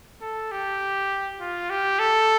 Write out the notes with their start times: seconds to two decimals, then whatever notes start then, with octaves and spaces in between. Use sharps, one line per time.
0.22 A4
0.51 G4
1.40 F4
1.70 G4
1.99 A4